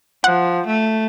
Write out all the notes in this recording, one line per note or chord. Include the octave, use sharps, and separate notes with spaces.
F3 F#5
A3